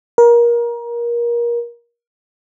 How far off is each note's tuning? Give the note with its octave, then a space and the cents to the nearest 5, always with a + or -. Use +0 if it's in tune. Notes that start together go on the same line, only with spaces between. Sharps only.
A#4 +25